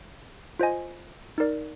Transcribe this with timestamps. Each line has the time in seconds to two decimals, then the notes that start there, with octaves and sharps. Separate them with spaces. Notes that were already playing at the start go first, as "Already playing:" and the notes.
0.59 F4 C5 D#5 G#5
1.38 D#4 A#4 D5